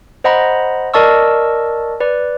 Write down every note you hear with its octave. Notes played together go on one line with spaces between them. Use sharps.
C5 D#5 F#5 A#5 B5
A#4 D5 D#5 A5 C#6 E6
B4 D5